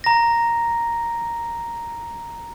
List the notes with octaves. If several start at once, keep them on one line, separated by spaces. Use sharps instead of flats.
A#5 A#6